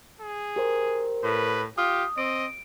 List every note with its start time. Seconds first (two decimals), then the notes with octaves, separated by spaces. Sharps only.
0.21 G#4
0.56 G4 A#4 C5
1.24 A2 B4
1.78 F4 G4 D#6
2.18 C4 D#5 D7